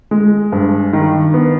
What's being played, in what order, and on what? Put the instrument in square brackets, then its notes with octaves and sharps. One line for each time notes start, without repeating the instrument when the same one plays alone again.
[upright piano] G#3
G2
D#3
B3